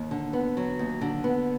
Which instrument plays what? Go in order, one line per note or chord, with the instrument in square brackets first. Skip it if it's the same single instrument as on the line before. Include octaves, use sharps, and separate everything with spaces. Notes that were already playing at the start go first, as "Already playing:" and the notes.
Already playing: [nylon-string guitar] D#2
D3
B3
F#3
D#2
D3
B3